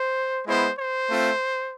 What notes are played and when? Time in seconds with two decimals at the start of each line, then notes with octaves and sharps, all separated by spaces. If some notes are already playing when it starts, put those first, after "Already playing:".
Already playing: C5
0.46 G#3 B3 E4 C5
0.77 C5
1.08 A3 C4 F4